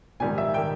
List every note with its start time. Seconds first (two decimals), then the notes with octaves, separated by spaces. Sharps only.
0.20 A#1 G#2 D#3 G3 G#5
0.38 E5
0.54 D#3 G3 G5